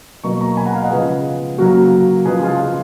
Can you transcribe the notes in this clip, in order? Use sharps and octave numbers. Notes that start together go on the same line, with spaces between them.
B2 F#3 A#3 A#5 C#6
A#5 C#6
G#5 B5
F#5 A#5
F5 G#5
D#5 F#5
C#3 F3 G#3 B3 G#4 B4
C#3 F#3 A#3 F#4 A#4
C#3 F3 G#3 G#4 B4
F4 G#4
F4 G#4